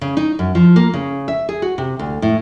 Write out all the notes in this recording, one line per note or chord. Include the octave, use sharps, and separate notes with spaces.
C#3
D#4
F#2
F3
A#3
C#3
E5
G#4
F#4
C3
D2
A2